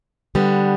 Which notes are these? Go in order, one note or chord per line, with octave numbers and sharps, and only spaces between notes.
D3 G3 B3